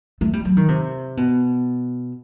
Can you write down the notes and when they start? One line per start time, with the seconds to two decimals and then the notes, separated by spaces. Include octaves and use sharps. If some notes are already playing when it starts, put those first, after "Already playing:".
0.21 A3
0.33 G3
0.45 F#3
0.57 D#3
0.68 C3
1.17 B2